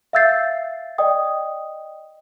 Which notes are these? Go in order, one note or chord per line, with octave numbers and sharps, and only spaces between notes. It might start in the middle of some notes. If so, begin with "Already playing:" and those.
E5 F5 E6 G6 A6 C7
D5 D#5 G5 D#6